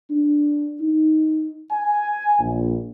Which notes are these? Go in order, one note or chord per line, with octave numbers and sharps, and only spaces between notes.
D4
D#4
G#5
A#1